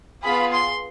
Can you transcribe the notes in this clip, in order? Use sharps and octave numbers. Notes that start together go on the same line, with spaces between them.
B3 F4 G#4 B5
C6